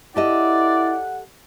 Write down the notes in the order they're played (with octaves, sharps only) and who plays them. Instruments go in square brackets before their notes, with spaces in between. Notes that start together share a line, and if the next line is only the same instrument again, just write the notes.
[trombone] E4 [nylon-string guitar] G4 A4 D#5 [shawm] D5 [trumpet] F#5